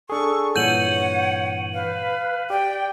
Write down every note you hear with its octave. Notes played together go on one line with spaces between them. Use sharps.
D4 G#4 A4 C#6
G2 A#2 E3 C#5 F#5 G6 D#7 F#7
B4 F5
G4 D5 G5